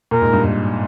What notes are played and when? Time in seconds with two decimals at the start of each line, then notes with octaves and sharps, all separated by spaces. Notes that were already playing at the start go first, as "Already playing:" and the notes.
0.11 A#2 A#4
0.22 G#2
0.33 G2
0.44 G#2